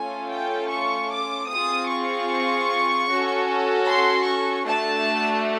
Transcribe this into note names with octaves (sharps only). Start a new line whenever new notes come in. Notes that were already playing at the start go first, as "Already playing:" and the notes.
Already playing: A3 C#4 F4 A4 G#5
G5
C#6
D6
C4 F4 G#4 D#6
C#6
C#4 F#4 A4
C6
C#6
A3 D4 F#4 A4 A5